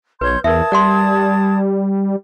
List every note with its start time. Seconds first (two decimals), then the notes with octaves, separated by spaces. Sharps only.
0.21 B1 B4 C#5 C6 G6
0.44 E2 A#4 E5 A5 D#6 G#6
0.72 G3 D5 F#5 C6